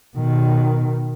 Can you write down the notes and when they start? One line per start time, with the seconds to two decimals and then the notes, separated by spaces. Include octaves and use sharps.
0.17 B2 D#3